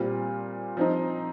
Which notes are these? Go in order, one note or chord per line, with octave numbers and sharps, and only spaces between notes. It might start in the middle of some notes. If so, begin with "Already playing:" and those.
Already playing: A#2 G3 C4 F4
F3 C4 D#4